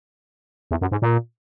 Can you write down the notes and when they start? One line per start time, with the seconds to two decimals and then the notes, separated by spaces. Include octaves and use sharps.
0.71 E2
0.81 F#2
0.92 G#2
1.02 A#2